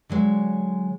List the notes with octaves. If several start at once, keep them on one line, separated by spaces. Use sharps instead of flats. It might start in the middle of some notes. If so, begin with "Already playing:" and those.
D3 F#3 G#3 C#5